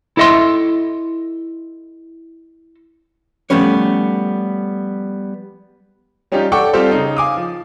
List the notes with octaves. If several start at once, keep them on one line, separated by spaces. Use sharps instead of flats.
E4 A4 D#5 E5 C6
F3 G3 A3 B3 C#4 C#5
G3 C#4 D#4 F4 G4
A4 D5 F#5 G5 C#6 D6
G3 C4 F4 G4 A4 C5
C#3 D#4
F5 G#5 D6 D#6
F3